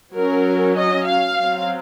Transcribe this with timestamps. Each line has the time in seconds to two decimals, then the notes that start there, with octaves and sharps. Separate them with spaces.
0.14 F#3 C#4 A#4
0.75 D#5
1.06 F5
1.37 F#3 C4